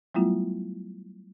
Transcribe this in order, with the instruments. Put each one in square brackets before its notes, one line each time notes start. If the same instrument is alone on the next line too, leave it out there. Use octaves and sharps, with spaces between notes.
[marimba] F#3 G3 A3 B3 E4 F4